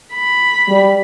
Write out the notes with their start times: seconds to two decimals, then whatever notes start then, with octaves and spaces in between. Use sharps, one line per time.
0.13 B5
0.69 G3